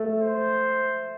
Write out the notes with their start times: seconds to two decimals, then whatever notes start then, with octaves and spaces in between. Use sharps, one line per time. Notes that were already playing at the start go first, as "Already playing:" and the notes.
Already playing: A3
0.20 C5